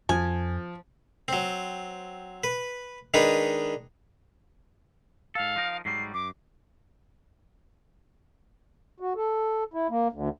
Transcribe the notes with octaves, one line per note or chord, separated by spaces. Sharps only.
F2 F3 G#5
F#3 C4
B4
D#3 G#3 D4 D#4 B4
G#2 A4 F5
F3 D#4 A#4
G#2 F#3 G3 C7
F#2 D6
F#4
A4
E4
A#3
D2